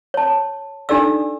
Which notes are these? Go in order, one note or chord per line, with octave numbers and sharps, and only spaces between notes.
C#5 A5
D4 D#4 G4 A4 D5 E6